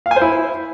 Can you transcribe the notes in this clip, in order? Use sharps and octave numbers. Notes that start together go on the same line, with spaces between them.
F5
G#5
C5
E4